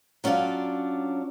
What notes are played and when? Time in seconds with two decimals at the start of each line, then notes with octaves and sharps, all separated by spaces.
0.24 F#3 C#4 D4 F4 D5